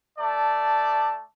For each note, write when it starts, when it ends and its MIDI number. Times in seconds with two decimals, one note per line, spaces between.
0.19 1.20 57
0.19 1.20 74
0.19 1.20 81